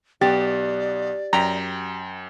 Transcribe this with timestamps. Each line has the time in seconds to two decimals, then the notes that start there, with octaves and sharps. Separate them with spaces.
0.21 B1 B3 G4 D5 A6
1.33 F#2 G5 A#5 B6